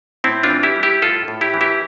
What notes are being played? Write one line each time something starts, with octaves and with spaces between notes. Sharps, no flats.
A2 C4 E4
D4 F4
E3
E4 G4
G3
E4 G4
A2 F4 A4
A2
E4 G4
E3
E4 G4